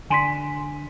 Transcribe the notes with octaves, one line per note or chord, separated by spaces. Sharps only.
D3 G#5 C6 B6